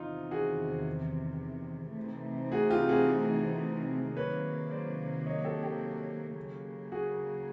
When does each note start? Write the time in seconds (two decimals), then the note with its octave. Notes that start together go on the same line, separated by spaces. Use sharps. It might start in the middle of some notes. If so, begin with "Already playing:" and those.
Already playing: E2 C3 D#3 D#4 F4
0.31 F#4 G#4
1.97 C3 E3 A3 C4 D#4
2.52 F#4 G#4
2.70 F4 G4
2.89 F#4 G#4
4.16 C3 D#3 F#3 A#3 B4 C#5
4.71 C5 D5
5.26 C#5 D#5
5.44 G4 A4
5.63 G4 A4
6.37 C#3 F#3 A#3
6.92 F#4 G#4